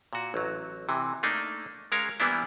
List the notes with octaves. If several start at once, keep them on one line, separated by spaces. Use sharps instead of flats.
A#2 F#4
A1 F#3
C3 E3
A3 A#3 D4 D#4
G#3 C#4 A#4 C#5 F5
E3 G3 A#3 B3 D4 E4